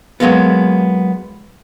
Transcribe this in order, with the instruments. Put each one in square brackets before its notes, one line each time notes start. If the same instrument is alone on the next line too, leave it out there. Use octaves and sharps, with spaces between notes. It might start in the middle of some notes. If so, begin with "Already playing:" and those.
[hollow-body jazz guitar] F#3 G#3 A#3 B3